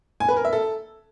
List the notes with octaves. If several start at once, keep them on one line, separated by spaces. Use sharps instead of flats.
G#5
B4
A#4
E5
A4